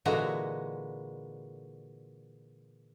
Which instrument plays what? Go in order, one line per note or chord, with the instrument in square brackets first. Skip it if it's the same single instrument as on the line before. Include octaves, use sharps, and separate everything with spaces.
[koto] A#2 D3 E3 G#3 F#4 A#5